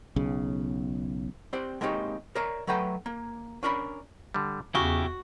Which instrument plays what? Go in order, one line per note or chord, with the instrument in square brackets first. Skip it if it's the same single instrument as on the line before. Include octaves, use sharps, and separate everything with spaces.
[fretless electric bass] B1 C#3
[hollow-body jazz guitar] C4 G4 C5 D5
G#3 A#3 C4 D#4 G4 C#5
A#4 C#5 D5 E5 A#5
F#3 A3 B4 G5 A#5
A#3
C#4 D4 A#4 D5 A#5 B5
[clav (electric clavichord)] D3 G3
[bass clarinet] E2 [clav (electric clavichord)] C#3 [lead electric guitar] E4 G4 [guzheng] F#4